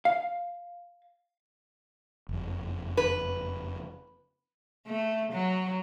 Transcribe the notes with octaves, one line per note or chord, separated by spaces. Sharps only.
F5
F#1 F2
B4
A3
F#3